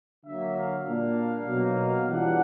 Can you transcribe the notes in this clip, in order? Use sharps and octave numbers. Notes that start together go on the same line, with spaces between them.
D3 F#3 A#3 E5
F5
A#2 G3 A#3 D4
B2 F#3 A#3 D#4
F5
E3 G3 B3 D4 F4 F#5